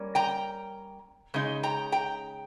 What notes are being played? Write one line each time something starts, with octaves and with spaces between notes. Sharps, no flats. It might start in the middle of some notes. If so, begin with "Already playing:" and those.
Already playing: G3 A#3 C#4
G5 A#5
C#3 G#3 D#4
G5 A#5
G5 A#5